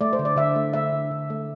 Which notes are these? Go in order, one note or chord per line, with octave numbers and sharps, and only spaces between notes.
A3 D5
C5
D3
D5
D3 E5
A3
A3 E5
D3
D3
A3